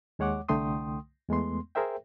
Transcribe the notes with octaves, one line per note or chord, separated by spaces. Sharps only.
D#2 G#3 C#5 F#5 D6
C2 D3 A3 G5 C6 D#6
E2 G#3 A3 B3 C6
G#4 A#4 C5 E5 G5